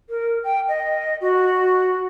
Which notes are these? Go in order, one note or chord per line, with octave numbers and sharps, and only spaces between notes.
A#4
G5
D#5
F#4